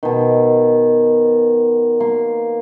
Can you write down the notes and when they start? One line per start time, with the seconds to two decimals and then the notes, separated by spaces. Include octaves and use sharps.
0.03 B2 D#3
2.00 A#3 C6